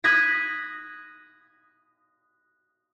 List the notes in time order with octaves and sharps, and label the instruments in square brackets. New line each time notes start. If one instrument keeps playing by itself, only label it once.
[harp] D#6 F#6 G#6 A#6 B6